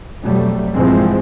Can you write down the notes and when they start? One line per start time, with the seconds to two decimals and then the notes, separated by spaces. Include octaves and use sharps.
0.22 F2 B2 F#3 G3 A3
0.74 A#1 G2 E3 F3 G#3 C4